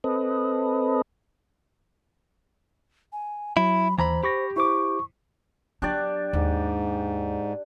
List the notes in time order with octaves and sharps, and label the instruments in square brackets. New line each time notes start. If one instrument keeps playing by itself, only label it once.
[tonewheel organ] C4 A4 B4 D#5
[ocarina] G#5
[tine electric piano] F#3 [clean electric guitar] E4 [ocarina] B5
[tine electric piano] D#2 [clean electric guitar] E3 A#5 B5 [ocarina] C5
[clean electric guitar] G4 [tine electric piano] B5 C#6 A#6
[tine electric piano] E4 C5 D6 [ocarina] C#6
[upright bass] F#3 [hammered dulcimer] D4 G4 D5
[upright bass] D#2 [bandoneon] G#2